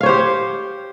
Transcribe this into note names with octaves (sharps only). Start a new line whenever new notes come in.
G4 C5 C#5 F5